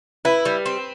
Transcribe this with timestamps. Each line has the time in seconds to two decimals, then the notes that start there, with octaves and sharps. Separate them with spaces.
0.25 E4 B4
0.45 G3
0.66 C4